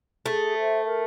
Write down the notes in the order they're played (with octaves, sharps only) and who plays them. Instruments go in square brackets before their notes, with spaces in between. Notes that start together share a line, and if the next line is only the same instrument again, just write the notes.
[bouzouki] A3 [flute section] G#4
[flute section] C5 E5
A#4